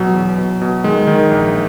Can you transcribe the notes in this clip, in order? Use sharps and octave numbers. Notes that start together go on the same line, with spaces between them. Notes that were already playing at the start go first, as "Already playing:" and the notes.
Already playing: B2 F#3
E2
B2
B2
D#3 G#3
D#3
A#1